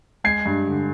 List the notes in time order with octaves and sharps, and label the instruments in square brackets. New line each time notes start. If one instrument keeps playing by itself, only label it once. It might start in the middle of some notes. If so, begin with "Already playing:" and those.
[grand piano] G#3 G#6 C7
G2
D3